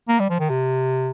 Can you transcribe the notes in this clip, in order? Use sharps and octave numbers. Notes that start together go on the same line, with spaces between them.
A#3
G3
F3
D#3
C3